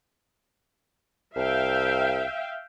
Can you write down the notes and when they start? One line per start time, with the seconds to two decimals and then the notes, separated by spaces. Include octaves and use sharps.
1.36 C2 E5 F5 G5